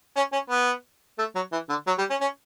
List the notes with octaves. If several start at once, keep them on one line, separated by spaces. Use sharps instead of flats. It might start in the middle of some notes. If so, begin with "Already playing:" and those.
C#4
C#4
B3
A3
F#3
E3
D3
F#3
G3
C#4
C#4